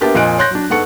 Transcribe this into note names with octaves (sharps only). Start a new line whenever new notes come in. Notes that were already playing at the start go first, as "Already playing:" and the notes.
A#3 B3 D4 G4 E5 A5
F2 A#2 D#5 G#5 F#6 D7
C#5 C6 F#6 G6 A#6
F#3 D4
G#2 B3 A4 F#5 C#6 C#7